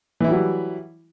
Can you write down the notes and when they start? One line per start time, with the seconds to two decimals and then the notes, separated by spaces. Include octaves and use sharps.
0.20 E3
0.24 E4
0.28 G3
0.31 F#3